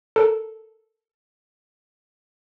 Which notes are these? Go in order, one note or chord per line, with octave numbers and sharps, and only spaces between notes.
A4 A#4